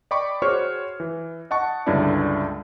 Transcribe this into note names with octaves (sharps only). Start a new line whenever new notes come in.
D5 D#5 G5 B5 C#6 D6
F#4 G#4 C5 C#5 C#6 F6
E3
D#5 F#5 A5 C#6
C#2 G2 D3 C#4 E4 D5